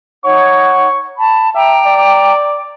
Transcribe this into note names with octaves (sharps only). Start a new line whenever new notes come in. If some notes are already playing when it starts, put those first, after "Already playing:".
D#4 C#5 F#5 C#6
A5 B5
E5 G5 A#5 D6
D5